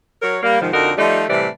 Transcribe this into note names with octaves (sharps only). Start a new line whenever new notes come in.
F#3 A#4 C#5
G3 A#3
G#2 C3 D#3 F3
F2 D3 D#4 F#4 A#4
F3 G3 A3 D#4
A2 C3 E3 G3 D5